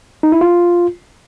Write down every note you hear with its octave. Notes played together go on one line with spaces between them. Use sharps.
D#4
E4
F4